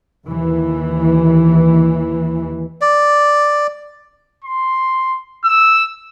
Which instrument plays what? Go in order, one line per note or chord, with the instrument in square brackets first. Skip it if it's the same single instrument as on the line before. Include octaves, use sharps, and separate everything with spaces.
[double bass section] D#2 E3
[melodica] D5
[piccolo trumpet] C6
E6